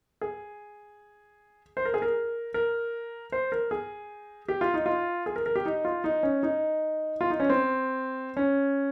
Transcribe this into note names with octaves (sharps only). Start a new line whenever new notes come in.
G#4
C5
A#4
G#4
A#4
A#4
C5
A#4
G#4
G4
F4
D#4
F4
G#4
A#4
A#4
G4
D#4
F4
D#4
C#4
D#4
F4
D#4
C#4
C4
C#4